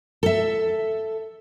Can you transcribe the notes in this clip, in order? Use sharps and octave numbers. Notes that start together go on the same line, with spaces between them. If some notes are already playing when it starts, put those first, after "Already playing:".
A4 E5